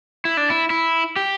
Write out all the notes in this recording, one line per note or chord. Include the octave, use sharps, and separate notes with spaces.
E4
D4
E4
E4
G4